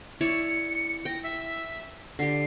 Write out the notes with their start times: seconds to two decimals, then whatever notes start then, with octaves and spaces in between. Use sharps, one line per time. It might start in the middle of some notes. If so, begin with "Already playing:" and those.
0.21 E4 C#5 D5 C#7
1.05 G5 A#6
1.23 E5
2.19 D3 G4 C7